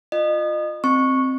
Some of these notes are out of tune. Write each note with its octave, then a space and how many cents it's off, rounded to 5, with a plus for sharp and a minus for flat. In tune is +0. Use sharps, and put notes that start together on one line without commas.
F4 +0 D#5 -30
C4 +5 C#6 -5